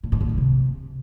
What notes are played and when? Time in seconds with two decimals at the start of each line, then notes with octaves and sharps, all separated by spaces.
0.03 A#2
0.12 G#2
0.21 A#2
0.29 F2
0.38 C3